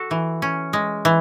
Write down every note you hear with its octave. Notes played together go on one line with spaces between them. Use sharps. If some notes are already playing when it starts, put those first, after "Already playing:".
Already playing: F#4 A4
E3
C#4
G#3
E3